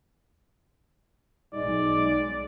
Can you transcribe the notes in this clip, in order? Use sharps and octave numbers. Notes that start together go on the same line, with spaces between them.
B1 G#3 D#4 D5